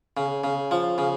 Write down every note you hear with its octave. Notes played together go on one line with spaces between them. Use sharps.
C#3
C#3
F3
C#3